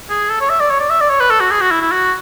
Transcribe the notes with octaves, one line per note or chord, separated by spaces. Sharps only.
G#4
A4
C#5
E5
D5
C#5
D5
E5
D5
C#5
B4
A4
F#4
G#4
F#4
E4
E4
F#4